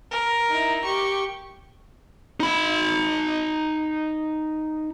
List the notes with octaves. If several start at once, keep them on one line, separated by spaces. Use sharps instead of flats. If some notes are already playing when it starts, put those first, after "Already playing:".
A#4
D#4 E4
G4 C#6
D#4 B5